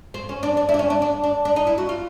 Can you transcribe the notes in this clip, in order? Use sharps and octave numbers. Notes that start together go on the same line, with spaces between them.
C4
C#4
D4
D4
E4
D4
C#4
D4
D4
D4
D4
D#4
E4
F#4
F4